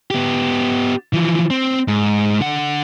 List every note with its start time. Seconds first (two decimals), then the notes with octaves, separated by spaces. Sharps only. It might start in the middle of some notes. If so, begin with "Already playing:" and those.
0.10 B3 G4
1.14 E3 F3
1.50 C4
1.88 G#2
2.40 D3 F#5